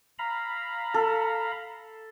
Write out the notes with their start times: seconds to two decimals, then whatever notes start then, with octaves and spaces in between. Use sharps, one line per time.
0.19 F5 A#5 B5
0.94 A4